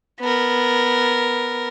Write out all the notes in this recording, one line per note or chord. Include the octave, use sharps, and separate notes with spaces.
B3 A#4